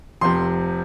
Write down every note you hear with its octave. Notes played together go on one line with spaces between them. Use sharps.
F1 F2 C3 F3 C6